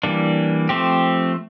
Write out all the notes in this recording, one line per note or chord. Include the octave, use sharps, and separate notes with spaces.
E3 G3 A#3 D4
F3 A3 C4 G4